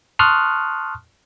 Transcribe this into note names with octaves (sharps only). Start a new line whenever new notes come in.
A5 C6 C#6 D#6 F6 F#6